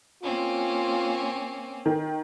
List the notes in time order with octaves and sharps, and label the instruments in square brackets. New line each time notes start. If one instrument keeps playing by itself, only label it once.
[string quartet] A#3 C4 C#4 [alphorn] F4
[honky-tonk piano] D#3